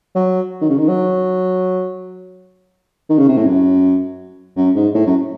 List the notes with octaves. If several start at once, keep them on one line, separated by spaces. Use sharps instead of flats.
F#3
D#3
C#3
D#3
F#3
D#3
C#3
C3
A2
F#2
F#2
G#2
A2
F#2